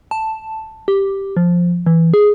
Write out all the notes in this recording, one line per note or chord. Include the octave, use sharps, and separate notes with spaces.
A5
G4
F3
E3
G#4